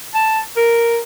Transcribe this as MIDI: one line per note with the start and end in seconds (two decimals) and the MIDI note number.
0.14 0.40 81
0.57 0.99 70